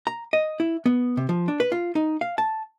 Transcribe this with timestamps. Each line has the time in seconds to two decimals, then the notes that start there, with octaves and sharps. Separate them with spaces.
0.07 A#5
0.33 D#5
0.60 E4
0.86 B3
1.17 C3
1.29 F3
1.48 D4
1.60 B4
1.72 F4
1.95 D#4
2.21 F5
2.38 A5